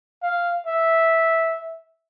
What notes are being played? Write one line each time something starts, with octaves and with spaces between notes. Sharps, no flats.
F5
E5